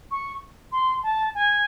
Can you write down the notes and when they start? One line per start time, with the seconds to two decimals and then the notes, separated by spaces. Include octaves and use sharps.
0.11 C#6
0.72 C6
1.03 A5
1.35 G#5